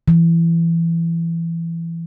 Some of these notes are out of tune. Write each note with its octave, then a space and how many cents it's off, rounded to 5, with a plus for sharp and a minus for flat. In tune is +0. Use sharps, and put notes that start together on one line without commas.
E3 +20